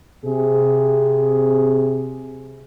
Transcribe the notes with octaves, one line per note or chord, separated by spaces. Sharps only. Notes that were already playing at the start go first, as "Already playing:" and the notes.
C3 G#4